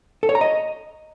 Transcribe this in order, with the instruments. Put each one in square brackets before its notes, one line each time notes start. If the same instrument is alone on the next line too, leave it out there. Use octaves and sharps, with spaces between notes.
[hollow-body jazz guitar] A4
C#5
A#5
D#5